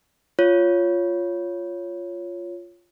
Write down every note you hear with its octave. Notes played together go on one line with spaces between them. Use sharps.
F4 C#5